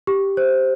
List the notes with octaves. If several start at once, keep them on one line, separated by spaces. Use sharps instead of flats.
G4
C5